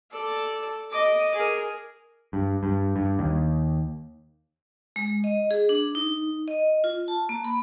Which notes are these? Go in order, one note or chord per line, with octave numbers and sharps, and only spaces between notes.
A4 D5
D#5 D6
G#4 A#4
G2
G2
G2
D#2
G#3
D#5
G#4
D4
D#4
D#5
F4
A5
A#3
B5